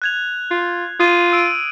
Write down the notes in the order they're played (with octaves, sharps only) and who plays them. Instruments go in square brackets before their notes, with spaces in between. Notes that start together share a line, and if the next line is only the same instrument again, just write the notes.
[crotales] F#6 G#6 F7
[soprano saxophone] F4
[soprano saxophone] F4 [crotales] D#6 D#7
[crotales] E6 D7 D#7